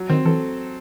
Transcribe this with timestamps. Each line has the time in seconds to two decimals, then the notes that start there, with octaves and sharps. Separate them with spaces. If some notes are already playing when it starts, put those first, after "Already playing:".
Already playing: F#3
0.09 D#3 C4
0.25 E3 A4